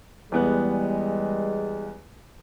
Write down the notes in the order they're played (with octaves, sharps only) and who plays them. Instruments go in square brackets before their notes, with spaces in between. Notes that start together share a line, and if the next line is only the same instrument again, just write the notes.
[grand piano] E2 B3 F#6 [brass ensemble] G3 G#3